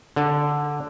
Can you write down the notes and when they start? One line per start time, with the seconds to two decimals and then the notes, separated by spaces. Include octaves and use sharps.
0.16 D3